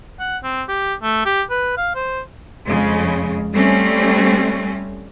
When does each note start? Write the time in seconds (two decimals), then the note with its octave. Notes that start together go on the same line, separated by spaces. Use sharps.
0.20 F#5
0.44 C4
0.69 G4
1.03 A3
1.26 G4
1.51 B4
1.77 F5
1.95 C5
2.67 F2 C#3 G#3
3.54 G3 A3 C4 C#4